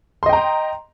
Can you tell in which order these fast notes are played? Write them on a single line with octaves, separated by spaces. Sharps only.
C6 D#5 G5 A#5